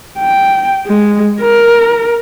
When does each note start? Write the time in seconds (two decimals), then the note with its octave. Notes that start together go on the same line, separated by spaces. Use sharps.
0.18 G5
0.87 G#3
1.41 A#4